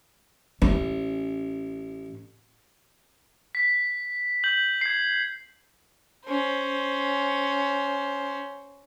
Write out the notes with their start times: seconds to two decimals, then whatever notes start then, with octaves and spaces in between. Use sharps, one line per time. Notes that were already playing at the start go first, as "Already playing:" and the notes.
0.62 A1 C#4
3.55 B6
4.44 G6 F#7
4.81 G#6 C7
6.25 C#4 C5